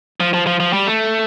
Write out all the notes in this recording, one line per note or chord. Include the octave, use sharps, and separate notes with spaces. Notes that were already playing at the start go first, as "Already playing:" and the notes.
F3
F3
F3
F3
G3
A3